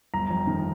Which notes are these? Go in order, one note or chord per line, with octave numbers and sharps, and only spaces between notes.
G1 A#5
F2
D#3